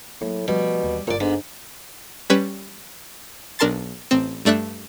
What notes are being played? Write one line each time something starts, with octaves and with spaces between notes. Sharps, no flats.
A2 F#3 A#3
B2 F3 G3 A3
D#2 E3
G1 A#2 C#5 D5
G#2 D3 B3
G3 C#4 B4
B1 D4 A#4 A5 C6 A6
A1 C4
G2 A3 D4 E5 F#6